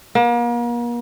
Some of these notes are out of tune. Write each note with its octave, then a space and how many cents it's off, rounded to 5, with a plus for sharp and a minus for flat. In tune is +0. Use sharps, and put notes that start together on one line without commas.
A#3 +40